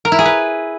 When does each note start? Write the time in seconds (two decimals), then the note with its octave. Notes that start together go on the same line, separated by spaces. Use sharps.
0.05 A#4
0.12 E4
0.19 G#4
0.25 B4